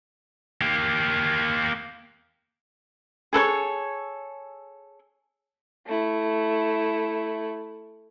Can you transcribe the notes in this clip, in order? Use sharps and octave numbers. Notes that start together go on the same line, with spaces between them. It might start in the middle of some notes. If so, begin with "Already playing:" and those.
A#3 G4
G#4 A4 B4 C#5
A3 E4